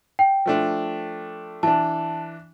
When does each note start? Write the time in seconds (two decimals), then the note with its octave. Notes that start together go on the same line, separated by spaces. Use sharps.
0.19 G5
0.46 F3 A3 D4
1.63 E3 D4 A5